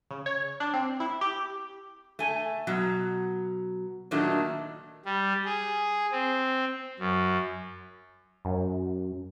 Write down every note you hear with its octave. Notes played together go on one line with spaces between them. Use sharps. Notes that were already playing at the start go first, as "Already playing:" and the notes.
C#3
C#5
D4
C4
E4
G4
A3 G#5
B2 F#3
A#2 D#3 F#3 A3 D4
G3
G#4
C4
F#2
F#2